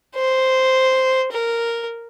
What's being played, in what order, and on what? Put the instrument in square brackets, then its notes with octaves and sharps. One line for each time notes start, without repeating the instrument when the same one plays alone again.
[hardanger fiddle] C5
A#4